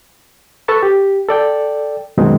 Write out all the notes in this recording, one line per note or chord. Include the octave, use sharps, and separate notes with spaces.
A4 B4 A5 C#6
G4
A4 D5 G5
F#2 B2 D#3 G#3 C4 D#4